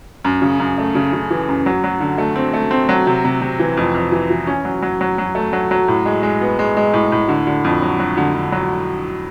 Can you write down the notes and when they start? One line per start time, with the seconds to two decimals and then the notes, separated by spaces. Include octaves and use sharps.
0.24 F#2
0.42 C#3
0.60 F#2
0.78 A3
0.95 C#3
1.13 C#3
1.30 E3
1.49 F#2
1.66 F#3
1.84 F#3
2.01 D3
2.18 A3
2.36 C4
2.53 A3
2.71 C4
2.89 F#3
3.07 C3
3.24 C3
3.42 C3
3.59 E3
3.77 F2
3.95 F2
4.12 E3
4.30 E3
4.47 C#4
4.65 F#3
4.82 F#3
5.01 F#3
5.18 F#3
5.35 A3
5.53 F#3
5.71 F#3
5.88 A2
6.06 G#3
6.23 G#3
6.41 B3
6.59 G#3
6.77 G#3
6.94 A2
7.12 A2
7.28 D3
7.47 D3
7.64 F2
7.82 F#3
7.99 F#3
8.17 D3
8.35 D3
8.52 F#3